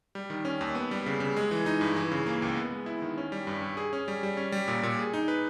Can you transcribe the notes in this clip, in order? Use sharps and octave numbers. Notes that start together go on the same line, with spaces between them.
G3
D#3
C#4
D#2
B3
G3
C#3
C#3
G#3
E3
D#4
G2
E3
C#3
A#3
C#2
B3
G#3
E4
D#3
C#4
G3
G2
G2
G#4
C#4
G3
G3
C#4
G3
A#2
A#2
G#4
D#4
B4